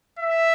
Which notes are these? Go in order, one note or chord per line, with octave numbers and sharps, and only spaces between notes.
E5